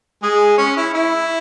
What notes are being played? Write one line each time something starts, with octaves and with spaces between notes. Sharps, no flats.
G#3 G#4
C#4 C#5
E4
E4